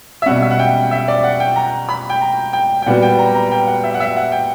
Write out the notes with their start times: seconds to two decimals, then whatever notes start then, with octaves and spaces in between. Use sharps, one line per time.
0.22 E5
0.26 B2 G3 C#4 F#5
0.42 E5
0.51 F#5
0.59 G5
0.91 E5
1.08 D5
1.24 F#5
1.40 G5
1.56 A#5
1.89 B5
2.10 G5
2.21 A#5
2.53 G5
2.82 G5
2.86 A#2 G3 B3 F#4 F#5
3.02 G5
3.19 A#5
3.35 A#5
3.52 G5
3.67 F#5
3.84 E5
3.94 F#5
4.00 E5
4.17 F#5
4.32 G5